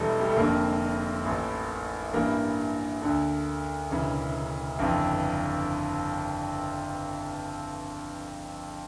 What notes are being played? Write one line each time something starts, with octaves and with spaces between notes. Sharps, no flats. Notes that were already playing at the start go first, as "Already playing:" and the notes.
Already playing: E1 E2 E3 G3 A3
G3
A3
F1 F2 D3 A#3
A1 A2 E3
A1 G2 E3 A#3
D2 D3
E1 D2 C#3 E3
G1 F2 C#3 E3